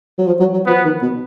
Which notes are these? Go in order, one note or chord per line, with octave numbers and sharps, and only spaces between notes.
F#3
F3
F#3
F#3
F3 B3
D#3
B2